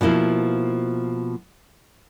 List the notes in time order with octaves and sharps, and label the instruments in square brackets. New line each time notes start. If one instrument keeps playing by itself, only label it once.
[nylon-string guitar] B2 F3 A#3 E4